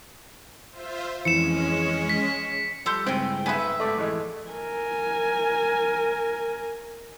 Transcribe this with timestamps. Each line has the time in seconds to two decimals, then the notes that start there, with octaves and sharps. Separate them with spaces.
0.71 F4 C5 E5
1.25 F2 E3 G#3 C#4 C#7 E7
2.09 B6
2.86 F3 G3 A4 C6 G6
3.06 C#2 G2 G#3 C4 E4 G5 G#5
3.46 B1 B3 B4 E5 G#5
3.80 G#2 C3 A3 D5
3.97 F2 G#2 E3 G#3 A3
4.51 A#4 G#5